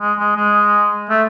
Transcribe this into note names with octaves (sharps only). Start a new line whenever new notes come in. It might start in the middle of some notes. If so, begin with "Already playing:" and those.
G#3
G#3
G#3
A3